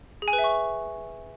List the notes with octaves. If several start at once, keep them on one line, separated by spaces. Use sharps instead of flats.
G#4
G#5
B4
E5
C#6